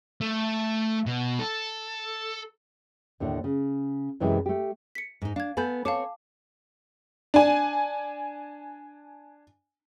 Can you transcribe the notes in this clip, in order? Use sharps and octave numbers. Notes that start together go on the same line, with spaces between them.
A3
B2
A4
D#2 A2 D3
C#3
F#2 C3 E3 G#3
A3 G4
B6 C#7
G#2 D#4
D4 F5 G#6
B3 A4 B4 G#5 B5 G6
C4 C#5 F5 A5 D6
D4 G#5